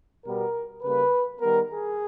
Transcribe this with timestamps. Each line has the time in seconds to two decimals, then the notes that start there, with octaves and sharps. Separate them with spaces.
0.25 B2 G3 B3 A#4
0.82 C#3 G3 A#3 B4
1.40 D#3 G3 B3 A#4
1.69 G#4